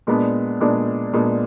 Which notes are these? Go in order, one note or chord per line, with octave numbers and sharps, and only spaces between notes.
A#2 G#3 B3 D4
A#2 G#3 B3 D4
A#2 G#3 B3 D4